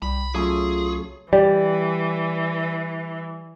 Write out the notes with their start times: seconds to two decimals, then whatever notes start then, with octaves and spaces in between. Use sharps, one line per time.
0.02 C2 G3 B5
0.35 F#3 A3 C#4 F4 G#4
1.33 E3 G3 D5